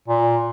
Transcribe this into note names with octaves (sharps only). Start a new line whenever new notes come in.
A#2